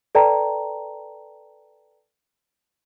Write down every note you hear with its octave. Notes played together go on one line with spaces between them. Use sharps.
A4 B4 D5 G5 A5 A#5